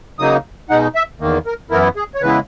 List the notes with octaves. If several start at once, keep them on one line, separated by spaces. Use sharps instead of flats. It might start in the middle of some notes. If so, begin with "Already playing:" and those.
C#3 F#3 A#3 D#4 D#6
B2 G#3 D#4 F#5
E5
E2 D#3 A#3
A#4
F#2 E3 B3 E4 A#4
G#4
C#5
C#3 E3 G#3 B3 E4 B4